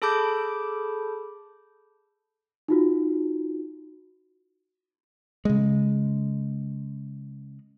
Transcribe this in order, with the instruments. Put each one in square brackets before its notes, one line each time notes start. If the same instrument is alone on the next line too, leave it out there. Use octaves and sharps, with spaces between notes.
[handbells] G#4 A4 A5 B5 D6 G6
[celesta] D#4 F4 F#4
[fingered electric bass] C#3 G#3